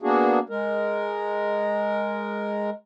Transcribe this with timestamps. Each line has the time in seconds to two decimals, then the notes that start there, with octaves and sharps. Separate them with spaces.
0.02 A#3 B3 D4 F#4 G#4
0.49 G#3 A#4